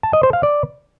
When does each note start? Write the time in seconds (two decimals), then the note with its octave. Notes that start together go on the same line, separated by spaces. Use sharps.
0.03 A5
0.13 D#5
0.23 C5
0.33 F5
0.43 D5